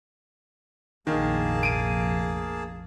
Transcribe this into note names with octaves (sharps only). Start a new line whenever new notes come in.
F1 A#1 D#3 A#3 G#4 A5
D7 D#7